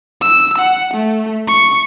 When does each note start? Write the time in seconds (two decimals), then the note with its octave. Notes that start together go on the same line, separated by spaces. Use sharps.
0.21 E6
0.58 F#5
0.94 A3
1.48 C#6